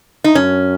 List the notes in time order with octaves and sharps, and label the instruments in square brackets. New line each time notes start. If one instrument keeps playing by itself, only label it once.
[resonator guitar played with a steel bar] D#4
[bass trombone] F#2 [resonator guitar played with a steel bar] C#4